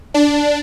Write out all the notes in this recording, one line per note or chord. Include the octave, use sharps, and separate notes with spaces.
D4